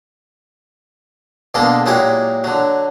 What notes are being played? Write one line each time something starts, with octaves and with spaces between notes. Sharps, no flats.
B2 D3 G#3 A#3 A4
A#2 F#3 G#3 E4 G4 C#5
D3 F#3